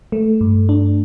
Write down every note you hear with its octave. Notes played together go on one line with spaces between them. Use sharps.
A3
G2
D4